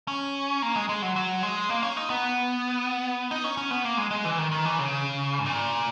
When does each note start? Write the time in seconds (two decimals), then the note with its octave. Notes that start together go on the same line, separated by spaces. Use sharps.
0.08 C#4
0.62 A#3
0.76 G#3
0.89 G#3
1.02 F#3
1.16 F#3
1.43 G#3
1.69 A#3
1.83 C#4
1.97 D#4
2.10 B3
3.31 D#4
3.44 C#4
3.57 C#4
3.71 B3
3.85 A#3
3.97 G#3
4.11 G#3
4.25 E3
4.39 D#3
4.51 D#3
4.65 E3
4.79 C#3
5.39 G#2
5.46 A#2